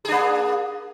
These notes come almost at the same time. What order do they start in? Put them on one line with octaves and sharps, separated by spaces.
G#4 D4 A#3